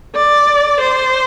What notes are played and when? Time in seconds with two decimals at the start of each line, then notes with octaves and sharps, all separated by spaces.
0.15 D5
0.80 C5